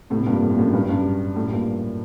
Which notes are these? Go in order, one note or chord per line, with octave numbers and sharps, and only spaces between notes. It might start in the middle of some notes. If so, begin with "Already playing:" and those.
A2 C3
C3
G2 A#2
A2
A#2
F#2 A2
G2
F#2
G2
F#2 A2
G2 A#2